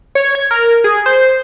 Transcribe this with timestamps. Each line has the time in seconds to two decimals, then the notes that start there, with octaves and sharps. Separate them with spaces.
0.15 C#5
0.35 G#6
0.51 A#4
0.84 G#4
1.06 C5